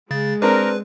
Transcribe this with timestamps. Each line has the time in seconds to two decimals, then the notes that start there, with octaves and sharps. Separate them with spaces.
0.11 C#3 G#3 A6
0.42 C4 D4 A#4 B4